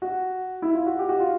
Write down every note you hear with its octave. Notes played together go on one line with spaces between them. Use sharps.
F#4
E4
F4
F#4
G4
F#4
F4